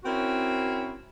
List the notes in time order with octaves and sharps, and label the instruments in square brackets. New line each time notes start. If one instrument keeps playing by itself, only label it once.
[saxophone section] C4 C#4 E4 F#4 A#4